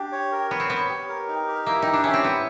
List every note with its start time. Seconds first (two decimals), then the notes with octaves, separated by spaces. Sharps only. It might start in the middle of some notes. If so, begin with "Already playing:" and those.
Already playing: D4 G4
0.12 C#5
0.32 A#4
0.51 B3 C#5
0.60 C4
0.70 B3 C#5
0.89 G4
1.09 A#4
1.28 D#4
1.48 G4
1.66 A#3 E4
1.82 D#4 G4
1.93 D4
2.04 C#4 E4
2.14 C4
2.24 B3 E4